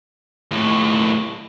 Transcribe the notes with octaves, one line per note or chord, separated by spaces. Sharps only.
D#2 A2